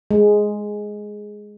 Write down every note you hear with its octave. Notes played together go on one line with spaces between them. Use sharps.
G#3